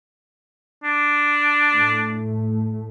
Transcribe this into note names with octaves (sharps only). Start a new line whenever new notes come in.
D4
A2 A3